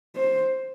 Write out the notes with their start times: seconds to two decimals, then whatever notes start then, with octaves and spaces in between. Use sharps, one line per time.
0.16 C5